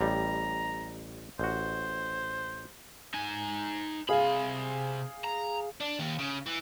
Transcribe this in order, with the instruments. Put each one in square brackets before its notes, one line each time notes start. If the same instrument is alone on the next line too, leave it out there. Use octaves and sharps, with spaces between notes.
[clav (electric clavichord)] A1 G3 [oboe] A#5
[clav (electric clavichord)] A1 F#4 [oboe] C5
[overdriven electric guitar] D#4 G#5
[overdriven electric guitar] C3 B5 [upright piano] G#4 F5
[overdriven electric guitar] A#5
D4
D#2
C#3
E3